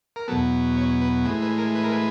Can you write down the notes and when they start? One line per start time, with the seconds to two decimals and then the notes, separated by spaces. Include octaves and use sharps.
0.16 A#4
0.28 E2 B2 F#3 B3 A4
0.77 C#5
1.01 B4
1.25 A2 E3 G#3 B4
1.42 B4
1.58 A#4
1.75 B4
1.84 A#4
1.92 B4